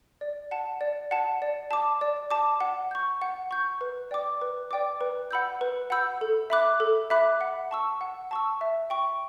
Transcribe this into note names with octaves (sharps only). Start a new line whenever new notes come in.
D5
F#5 A5
D5
F#5 A5
D5
A5 D6
D5
A5 D6
F#5
C#6 G6
F#5
C#6 G6
B4
D5 G5 D6
B4
D5 G5 D6
B4
F#5 B5 E6 G6
B4
F#5 B5 E6 G6
A4
E5 B5 D6 F#6
A4
E5 B5 D6 F#6
F#5
A5 C#6 E6
F#5
A5 C#6 E6
E5
G5 C#6